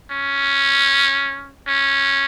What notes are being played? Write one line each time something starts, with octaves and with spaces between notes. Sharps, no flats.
C#4
C#4